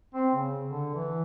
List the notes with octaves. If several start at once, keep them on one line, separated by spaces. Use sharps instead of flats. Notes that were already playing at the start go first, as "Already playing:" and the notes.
C4
C#3
D3
E3